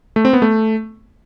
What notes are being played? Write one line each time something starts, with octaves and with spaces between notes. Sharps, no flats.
A3
C4
B3
A3